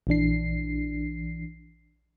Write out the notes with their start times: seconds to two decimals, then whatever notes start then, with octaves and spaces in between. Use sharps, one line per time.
0.07 A#1 E3 D4 C7